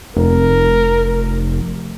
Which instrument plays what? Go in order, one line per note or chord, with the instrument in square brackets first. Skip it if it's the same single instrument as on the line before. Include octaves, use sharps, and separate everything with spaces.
[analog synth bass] F1 [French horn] A#4